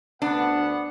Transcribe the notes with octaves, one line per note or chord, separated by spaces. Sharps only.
D2 B3 D4 F#5